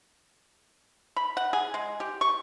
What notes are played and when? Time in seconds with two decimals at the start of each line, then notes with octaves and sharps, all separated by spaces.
1.16 B5
1.37 F#5
1.53 G#4
1.74 G#3
2.00 G4
2.21 C#6